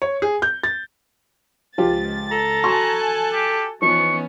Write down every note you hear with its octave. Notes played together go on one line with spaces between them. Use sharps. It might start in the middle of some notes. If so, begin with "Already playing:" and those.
C#5
G#4
G6
A6
C#2 F3 F4 G4 A6
A4 A#5
F#4 G#5 A5 C6 C#6 F#6
G4
E3 F3 B3 C#4 D#4 C#6